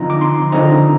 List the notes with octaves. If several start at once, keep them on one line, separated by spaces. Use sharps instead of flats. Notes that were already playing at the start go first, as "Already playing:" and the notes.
Already playing: D3 F3 C4 D#4 A#5
D6
C6
D3 F3 C4 D#4 A#5